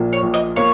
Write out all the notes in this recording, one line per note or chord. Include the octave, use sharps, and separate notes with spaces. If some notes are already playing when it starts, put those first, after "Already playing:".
Already playing: A#1 A#2 A#3
C#5
A#1
D#5
A#3 C#5